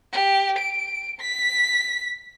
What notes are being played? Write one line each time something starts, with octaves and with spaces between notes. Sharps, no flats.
G4
D7
B6